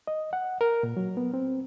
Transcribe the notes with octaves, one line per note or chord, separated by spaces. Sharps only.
D#5
F#5
A#4
A#2
F#3
B3
C4